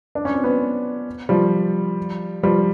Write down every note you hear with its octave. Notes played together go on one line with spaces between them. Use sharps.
D4
C#4
C4
B3 C#4
F3 G3
F3 G3